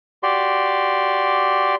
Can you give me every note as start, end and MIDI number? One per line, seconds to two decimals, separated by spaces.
0.23 1.75 66
0.23 1.75 67
0.23 1.75 74
0.23 1.75 84